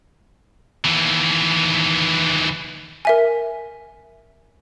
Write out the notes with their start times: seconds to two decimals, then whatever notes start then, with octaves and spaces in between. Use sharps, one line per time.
0.85 D#2 E3
3.05 A#4 E5 G#5